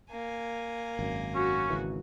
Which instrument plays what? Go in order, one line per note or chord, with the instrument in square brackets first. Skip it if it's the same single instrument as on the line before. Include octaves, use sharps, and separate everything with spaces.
[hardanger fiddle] A#3 G#5
[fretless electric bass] G#1 F#2
[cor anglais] C#4 [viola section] F#4
[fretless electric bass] G#1 C#3 E3